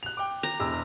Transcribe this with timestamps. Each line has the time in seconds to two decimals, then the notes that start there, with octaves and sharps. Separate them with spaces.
0.03 F#6 F7
0.17 G5 D6
0.43 A#5
0.60 E1 E2 E6